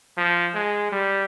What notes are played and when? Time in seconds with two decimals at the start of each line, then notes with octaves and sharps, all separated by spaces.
0.18 F3
0.54 G#3
0.92 G3